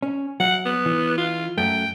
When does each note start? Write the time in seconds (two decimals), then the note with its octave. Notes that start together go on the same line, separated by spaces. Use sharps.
0.03 C#4
0.40 F#3 F#5
0.66 B3
0.86 E3
1.18 F4
1.58 F#2 A3 G5